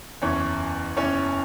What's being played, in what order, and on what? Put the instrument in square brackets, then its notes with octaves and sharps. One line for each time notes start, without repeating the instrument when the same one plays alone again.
[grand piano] F#1 E2 E3 C#4 C#5
F#1 E2 E3 C#4 C#5